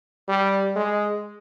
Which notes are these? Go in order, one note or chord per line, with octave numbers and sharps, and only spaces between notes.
G3
G#3